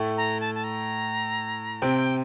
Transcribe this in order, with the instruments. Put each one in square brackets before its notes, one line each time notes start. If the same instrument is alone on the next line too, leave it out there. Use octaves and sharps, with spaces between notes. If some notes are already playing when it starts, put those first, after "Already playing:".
Already playing: [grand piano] A2 A3
[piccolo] A#5
A5
A5
A#5
[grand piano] C3 C4 [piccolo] G5